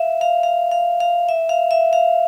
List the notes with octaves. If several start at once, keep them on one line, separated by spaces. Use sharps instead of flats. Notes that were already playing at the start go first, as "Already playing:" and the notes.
Already playing: E5 F5
F5
F5
F5
F5
E5
F5
E5
F5